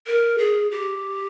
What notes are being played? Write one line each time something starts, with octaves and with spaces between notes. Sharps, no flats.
A#4
G#4
G4